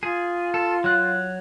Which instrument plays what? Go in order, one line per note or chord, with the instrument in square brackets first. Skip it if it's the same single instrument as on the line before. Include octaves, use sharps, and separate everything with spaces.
[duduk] F4 [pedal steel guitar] G#4
[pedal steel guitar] A4
F#3 F#6